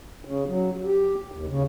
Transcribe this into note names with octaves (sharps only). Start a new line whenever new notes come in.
C#3
F#3
G4
D#2
C#3